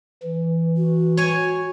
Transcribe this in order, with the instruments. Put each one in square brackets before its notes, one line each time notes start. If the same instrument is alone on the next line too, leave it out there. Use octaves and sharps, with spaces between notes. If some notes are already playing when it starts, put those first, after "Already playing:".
[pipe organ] E3
[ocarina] F#4
[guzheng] C#5 G#5